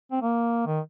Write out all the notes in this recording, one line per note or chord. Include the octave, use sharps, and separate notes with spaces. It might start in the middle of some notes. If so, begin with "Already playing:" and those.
C4
A#3
D#3